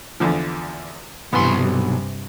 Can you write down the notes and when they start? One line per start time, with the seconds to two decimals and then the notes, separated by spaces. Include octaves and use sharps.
0.20 E2 D3 F3
1.33 B1 G2 C3 E3 B3 C6